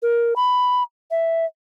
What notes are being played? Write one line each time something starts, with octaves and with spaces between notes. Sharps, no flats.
A#4
B5
E5